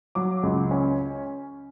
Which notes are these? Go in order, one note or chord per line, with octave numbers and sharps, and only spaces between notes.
F#3 D6
C#2
C#4